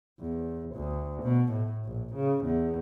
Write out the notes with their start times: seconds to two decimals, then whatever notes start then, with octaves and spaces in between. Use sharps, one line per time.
0.20 E2
0.75 D2
1.23 B2
1.53 A2
1.85 A#1
2.15 C#3
2.45 E2